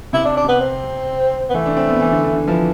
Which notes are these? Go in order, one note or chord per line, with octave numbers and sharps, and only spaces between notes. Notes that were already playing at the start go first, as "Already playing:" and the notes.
C3 E4
D4
D4
C3 B3
C4
B3
E3 A3
D4
C4
B3
E3
D3
D3
D3
E3 F3